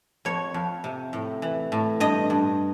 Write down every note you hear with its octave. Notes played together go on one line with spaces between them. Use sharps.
F2 C#5
F2
C3
A2
E3
A2
G2 D#5
G2